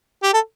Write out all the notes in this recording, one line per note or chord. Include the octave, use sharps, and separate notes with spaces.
G4
A4